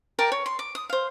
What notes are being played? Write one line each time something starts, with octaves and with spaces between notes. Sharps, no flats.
A#4 D5 G5 A5
C#5
C6
D6
D#6
C5 F5